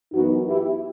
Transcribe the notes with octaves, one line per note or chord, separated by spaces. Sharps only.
F#2 E3 B3 D#4 F#4
E4 G4